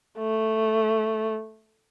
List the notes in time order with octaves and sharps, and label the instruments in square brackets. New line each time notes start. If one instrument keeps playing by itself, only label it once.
[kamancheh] A3